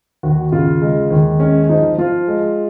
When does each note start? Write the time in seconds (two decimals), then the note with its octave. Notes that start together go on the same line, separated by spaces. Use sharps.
0.23 D#2 F#4
0.52 C#3 F4
0.82 G#3
1.11 D#2
1.40 G#3 C#4
1.69 F3 D#4
1.98 F3 F4
2.28 G#3